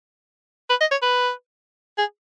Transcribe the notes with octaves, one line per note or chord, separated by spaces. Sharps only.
B4
D#5
C#5
B4
G#4